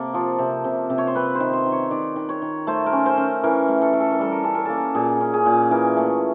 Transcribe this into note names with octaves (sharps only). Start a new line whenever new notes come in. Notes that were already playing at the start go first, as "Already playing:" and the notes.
Already playing: C3 A#3 A4
F3
C3
C3
C3
C#5
C5
C4 B4
C5
D#3
C5
D#3
C#5
D#3 D5
D#3
C#5
D#3
A3 C5
A#4
C#4
C5
C#4
E3 A#4
A3
A4
E3
A4
A#4
G3 A4
A#4
C#4 A4
A#4
A#3 A4
A#2 G#4
C#4
G#4
A#2
E3 A#4
A3